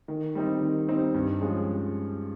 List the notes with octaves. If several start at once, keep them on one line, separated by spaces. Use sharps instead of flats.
D#3
G3 C4 D#4
D#3
G3 C4 D#4
G2
F3 G#3 C#4